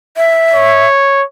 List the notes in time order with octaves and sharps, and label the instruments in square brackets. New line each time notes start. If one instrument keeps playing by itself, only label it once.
[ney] E5
[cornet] C#5